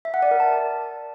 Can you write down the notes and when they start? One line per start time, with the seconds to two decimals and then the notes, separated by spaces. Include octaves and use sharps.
0.05 E5
0.14 F#5
0.22 D5
0.31 A#4
0.40 A5